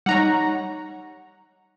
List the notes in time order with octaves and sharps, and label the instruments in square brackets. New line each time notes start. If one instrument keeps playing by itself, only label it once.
[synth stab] G3 D#4 C#5 [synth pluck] F#5 A#5